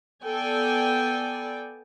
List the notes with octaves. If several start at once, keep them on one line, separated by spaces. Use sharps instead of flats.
B3 A4 D5 G5 G#5